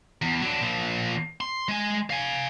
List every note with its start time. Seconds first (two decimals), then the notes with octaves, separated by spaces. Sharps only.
0.22 E2
0.42 F#3 D4
0.61 A#2 F3
1.41 C6
1.68 G#3 G#5
2.10 F5 G#5